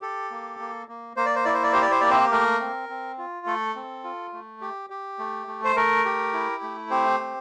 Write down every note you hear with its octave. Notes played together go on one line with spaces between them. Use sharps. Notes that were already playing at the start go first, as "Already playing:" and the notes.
G4 A4
A#3
A#3
A#3
A#3 C5
D5
C5
E4 D5
C5
D5
G4 C5
D5
C5
A#3 D5
C4 C5
A3 A#4
C4
C4
F4
A3 A4
C4
F4
A3
G4
G4
A3
A3
C5
A3 A#4
G4
E4
A3
C4 G4 C5
C4